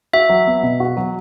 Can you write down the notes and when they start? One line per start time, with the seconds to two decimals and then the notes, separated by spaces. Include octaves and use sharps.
0.13 F#4 E5
0.29 F#3
0.47 B3
0.63 B2
0.80 F#4
0.97 F#3